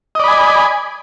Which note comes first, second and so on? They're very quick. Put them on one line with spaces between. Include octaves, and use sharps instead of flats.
D#5 D5 B5 G#5